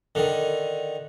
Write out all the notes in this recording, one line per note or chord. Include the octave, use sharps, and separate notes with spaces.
D3 D#3